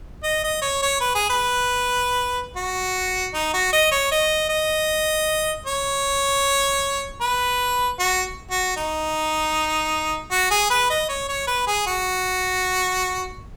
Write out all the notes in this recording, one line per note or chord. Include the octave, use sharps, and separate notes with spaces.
D#5
D#5
C#5
C#5
B4
G#4
B4
F#4
D#4
F#4
D#5
C#5
D#5
D#5
C#5
B4
F#4
F#4
D#4
F#4
G#4
B4
D#5
C#5
C#5
B4
G#4
F#4